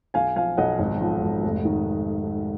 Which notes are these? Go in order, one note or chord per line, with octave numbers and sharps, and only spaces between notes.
B1 F5 G#5
F3 F5 G#5
B1 D#5 F#5
G#1
F3
G#1
F1
D#3